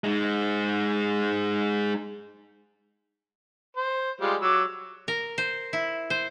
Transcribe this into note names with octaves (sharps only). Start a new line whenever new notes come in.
G#3 D#4
C5
G3 G#3 F4
F#3 D6 E6
A#4
C5
E4
C5